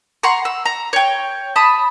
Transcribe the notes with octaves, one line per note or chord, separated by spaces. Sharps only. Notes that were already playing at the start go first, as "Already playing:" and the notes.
F#5 A#5 C6 C#6
E6
A#5
C#5 G5
A5 B5 D#6